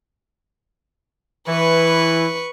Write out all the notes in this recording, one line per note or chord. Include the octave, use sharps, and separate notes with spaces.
E3 B4 C#6